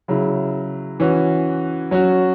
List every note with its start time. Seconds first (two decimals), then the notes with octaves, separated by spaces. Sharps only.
0.08 C#3 F#3 E4
1.00 E3 C#4 F#4
1.91 F#3 C#4 F#4